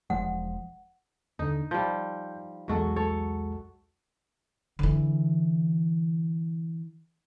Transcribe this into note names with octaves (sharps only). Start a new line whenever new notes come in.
E1 F3 G#3 F#5
D#2 D3 D#4
F3 G3 G6
B1 E2 F#3 G#3 F#4 A4
A4 C#5
D3 E3